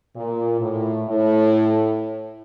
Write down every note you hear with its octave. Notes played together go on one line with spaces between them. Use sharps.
A#2
A2
A2